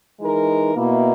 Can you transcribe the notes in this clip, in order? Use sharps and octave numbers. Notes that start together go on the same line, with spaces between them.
E3 G#3 D#4 A#4
B2 A#3 E4